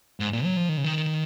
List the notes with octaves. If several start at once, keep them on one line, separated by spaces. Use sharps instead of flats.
G#2
A#2
F#3
F3
D#3
C#3
D#3